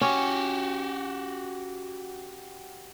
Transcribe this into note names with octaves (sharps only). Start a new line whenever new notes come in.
C#4 F#4 G4